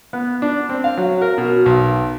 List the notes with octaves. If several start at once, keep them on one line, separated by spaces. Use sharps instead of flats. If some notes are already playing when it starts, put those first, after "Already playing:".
B3
D4
C4
F5
F#3
A#4
B2
B1